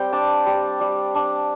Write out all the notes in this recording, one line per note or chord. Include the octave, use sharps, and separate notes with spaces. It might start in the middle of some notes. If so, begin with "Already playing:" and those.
Already playing: G3 C4 G5
D4 A5
G3
G3
D4